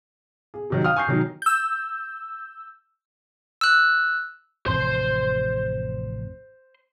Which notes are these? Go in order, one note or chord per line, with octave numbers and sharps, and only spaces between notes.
G#4
C3 D#3 F#3
F5 G5 D#6 F6
G#5 C#6 G6 C7
D#3 F#3 D#4
E6 G6
E6 F#6
A1 F2 C3 C5 C6